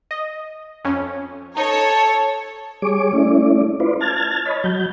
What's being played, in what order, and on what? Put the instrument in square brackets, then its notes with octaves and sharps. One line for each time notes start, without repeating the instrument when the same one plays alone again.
[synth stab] D#5
F2 C#4
[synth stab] D#4 [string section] A4 C#5 [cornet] A5
[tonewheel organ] G3 G#4 C#5 D6
A3 C#4 E4 D5
E4 F4 B4 C5 D5
A5 F6 G#6 A6
C#5 D#5 B5
F#3 G6